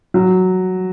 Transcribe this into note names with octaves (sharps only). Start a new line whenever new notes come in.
F#3